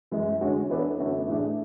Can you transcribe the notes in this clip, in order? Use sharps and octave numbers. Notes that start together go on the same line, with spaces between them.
F#2 E3 G#3
D3 G#3 C#4 F#4 C#5
E3 B3 D4 A4 C#5
F#2 D3 A3 C#4 F#4
A2 E3 A3 D4 G#4